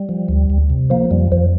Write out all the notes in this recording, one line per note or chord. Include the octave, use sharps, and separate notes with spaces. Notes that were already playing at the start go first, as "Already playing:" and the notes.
Already playing: G3
F3
D2
D2
C3
F3 A#3
F2 G3
F2 F3